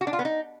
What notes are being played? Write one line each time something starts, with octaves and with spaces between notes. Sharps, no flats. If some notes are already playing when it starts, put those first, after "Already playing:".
F#4
D4
F4
B3
D#4